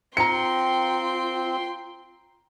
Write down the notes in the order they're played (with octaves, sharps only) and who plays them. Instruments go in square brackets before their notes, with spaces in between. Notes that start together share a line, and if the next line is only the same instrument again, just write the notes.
[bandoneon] C4 [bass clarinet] F4 [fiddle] G5 C6 [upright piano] A#5 C#7